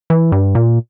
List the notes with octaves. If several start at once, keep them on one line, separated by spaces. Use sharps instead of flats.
E3
G2
A#2